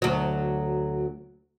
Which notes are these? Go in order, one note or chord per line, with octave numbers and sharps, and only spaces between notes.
D2 F#3